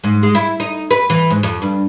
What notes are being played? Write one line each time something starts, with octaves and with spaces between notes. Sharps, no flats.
G#2
G#3
E4
D#4
B4
E3
G#2
F2
G2